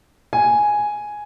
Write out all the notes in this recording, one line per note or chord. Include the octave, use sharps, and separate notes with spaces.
G#5